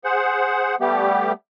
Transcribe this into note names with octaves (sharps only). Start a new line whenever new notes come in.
G#4 C5 F#5
G3 A3 B3 G4